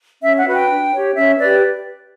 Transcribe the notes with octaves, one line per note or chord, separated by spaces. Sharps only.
C#4 E5
F#5
F#4 B4
G5
D4
G4 C#5
C#4 E5
G4 B4 D5